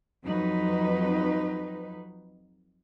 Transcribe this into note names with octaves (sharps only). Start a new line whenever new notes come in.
F2 F#3 D#4 B4